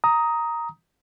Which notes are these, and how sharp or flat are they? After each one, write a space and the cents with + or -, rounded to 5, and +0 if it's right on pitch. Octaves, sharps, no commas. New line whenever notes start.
A#5 +0 D#6 +10